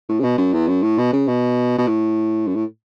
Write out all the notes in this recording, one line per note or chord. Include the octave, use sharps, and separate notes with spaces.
A2
C#3
B2
F#2
E2
F#2
A2
B2
C#3
B2
B2
A2
F#2
A2